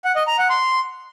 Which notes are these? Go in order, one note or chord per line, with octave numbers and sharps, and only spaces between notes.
F#5
D#5
A#5
F#5
C6